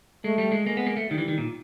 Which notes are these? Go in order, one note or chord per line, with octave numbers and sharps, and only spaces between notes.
G#3 A3
G3
G#3
G#3 A#3
B3
A#3
A3
D#3 G3
E3
D#3
A#2